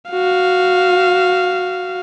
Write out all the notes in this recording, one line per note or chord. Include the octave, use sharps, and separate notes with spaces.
F#4 F5